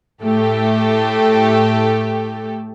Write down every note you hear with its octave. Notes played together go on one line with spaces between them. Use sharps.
A2 A3 G4 A4